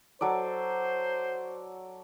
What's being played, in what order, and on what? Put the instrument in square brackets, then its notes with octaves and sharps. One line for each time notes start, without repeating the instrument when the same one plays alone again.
[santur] F#3 A4 D5 [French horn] C5